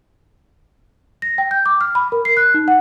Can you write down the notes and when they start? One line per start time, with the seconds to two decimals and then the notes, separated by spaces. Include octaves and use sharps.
1.22 A#6
1.38 G5
1.51 G6
1.66 D6
1.81 F6
1.95 B5
2.12 A#4
2.25 C7
2.37 F#6
2.54 D#4
2.68 F#5